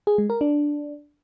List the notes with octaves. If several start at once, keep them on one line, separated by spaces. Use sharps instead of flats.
G#4
G#3
A#4
D4